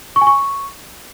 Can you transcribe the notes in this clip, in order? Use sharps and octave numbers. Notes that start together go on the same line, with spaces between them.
C#6
G#5
C#6